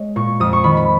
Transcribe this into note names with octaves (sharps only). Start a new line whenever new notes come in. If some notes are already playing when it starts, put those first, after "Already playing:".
Already playing: G#3 C#5
A#2 C#6
F2 D#6
C#6
D#3 B5
B5